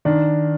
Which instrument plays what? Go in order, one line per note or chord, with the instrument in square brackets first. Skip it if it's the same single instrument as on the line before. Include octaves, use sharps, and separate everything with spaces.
[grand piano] D#3 D4